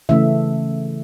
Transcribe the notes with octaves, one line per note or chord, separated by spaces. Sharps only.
C#3 E3 A3 E5